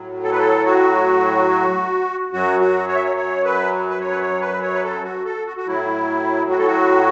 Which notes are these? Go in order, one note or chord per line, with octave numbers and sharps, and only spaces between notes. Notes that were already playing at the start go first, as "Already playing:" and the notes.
Already playing: A2 F#3
A4
B4
A4
F#4
F#2 F#3 F#4
F#4
C#5
E5
C#5
C#5
B4
B4
C#5
B4
C#5
B4
C#5
B4
A4
F#4
A4
F#4
F#4
A2 F#3 E4
F#4
A4
F#4